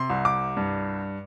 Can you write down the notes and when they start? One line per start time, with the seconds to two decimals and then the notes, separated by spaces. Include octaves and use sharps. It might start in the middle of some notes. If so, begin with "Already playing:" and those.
Already playing: C3 C6
0.10 C2
0.25 D6
0.57 G2